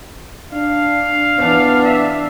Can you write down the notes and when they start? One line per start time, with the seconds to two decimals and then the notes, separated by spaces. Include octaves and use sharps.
0.53 D4 F5
1.38 E3 B3 D4
1.84 E5